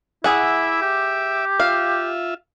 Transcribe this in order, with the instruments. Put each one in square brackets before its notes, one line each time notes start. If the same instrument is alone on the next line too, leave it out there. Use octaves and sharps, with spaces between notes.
[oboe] E4 [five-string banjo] G#4 F#5 [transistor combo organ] E5 D6
[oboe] G4
[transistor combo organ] F4 E5 [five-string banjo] F5